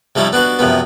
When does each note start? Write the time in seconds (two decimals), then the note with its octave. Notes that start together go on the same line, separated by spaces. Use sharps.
0.15 C3 F3 G3 C#4 D#4 E4
0.33 B3 D4 F#4 B4
0.59 F#2 C3 F3 B3